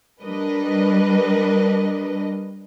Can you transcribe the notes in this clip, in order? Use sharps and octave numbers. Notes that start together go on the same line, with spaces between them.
G3 D4 A#4 B4 D#5